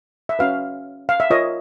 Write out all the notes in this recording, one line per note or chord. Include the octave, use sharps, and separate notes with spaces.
E5
C#4 F#4 B4 F5
F5
E5
F4 A#4 C#5 D#5